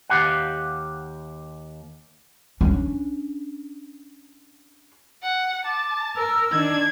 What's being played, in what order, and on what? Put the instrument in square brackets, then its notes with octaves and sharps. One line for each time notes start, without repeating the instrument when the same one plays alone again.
[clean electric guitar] D#2 G4 F5 F#5
[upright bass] C#4 D4
[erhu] F#5
[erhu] A5 [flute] D6
[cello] A#4 [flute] E6
[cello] D#3 D4 [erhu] G#6